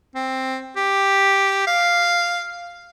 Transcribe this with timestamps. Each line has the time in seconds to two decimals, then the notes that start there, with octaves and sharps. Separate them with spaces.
0.15 C4
0.76 G4
1.67 F5